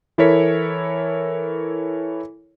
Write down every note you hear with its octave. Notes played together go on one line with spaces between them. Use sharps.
E3 E4 A4 A#4 C#5 B6